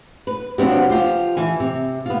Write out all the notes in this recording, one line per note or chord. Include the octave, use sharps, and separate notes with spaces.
B4
C3 F3 F#3 B3 C4 D4
F3 F4 G4
E3 G#5
C3
B3 F4